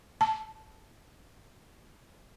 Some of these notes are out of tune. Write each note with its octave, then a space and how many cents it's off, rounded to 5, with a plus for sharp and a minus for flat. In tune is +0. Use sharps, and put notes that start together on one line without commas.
A5 -15